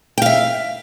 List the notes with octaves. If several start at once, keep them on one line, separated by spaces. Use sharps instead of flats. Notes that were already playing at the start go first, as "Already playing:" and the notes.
E5 F5 G5